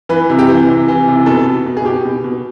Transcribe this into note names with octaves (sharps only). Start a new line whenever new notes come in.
E3 B4
C3
G4
E3
C3
E3
C3
B2 A4
B2
B2
G#4
B2 G4
B2
B2